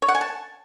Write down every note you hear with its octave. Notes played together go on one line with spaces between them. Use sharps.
C#5
F#5
G#5
A5